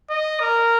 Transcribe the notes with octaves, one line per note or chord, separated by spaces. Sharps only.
D#5
A#4